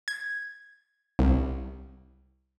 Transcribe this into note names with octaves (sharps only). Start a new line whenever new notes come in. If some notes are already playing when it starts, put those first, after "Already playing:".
G#6
C2